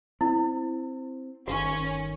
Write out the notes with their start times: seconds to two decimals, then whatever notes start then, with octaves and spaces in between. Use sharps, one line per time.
0.21 C4 E4
1.48 G1 D#3 C#4 F#4